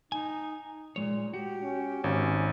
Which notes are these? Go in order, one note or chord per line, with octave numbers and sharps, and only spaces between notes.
D#4 G#5
A#2 G#3 C#5
F#4 G4
C#4
G#1 C#4